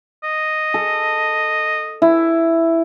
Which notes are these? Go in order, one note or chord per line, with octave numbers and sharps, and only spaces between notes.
D#5
A4
E4